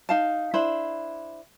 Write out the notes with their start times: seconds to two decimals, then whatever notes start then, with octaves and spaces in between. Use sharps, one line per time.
0.09 D#4 F5 A5
0.54 D4 E4 C5 B5